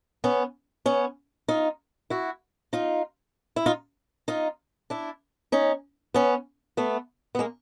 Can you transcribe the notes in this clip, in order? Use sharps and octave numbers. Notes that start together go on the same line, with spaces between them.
B3 C#4
B3 C#4
D#4 F4
E4 F#4
D#4 F4
E4
D#4 F4
D#4 F4
D4 E4
C#4 D#4
B3 C#4
A3 B3
B3
G#3 A#3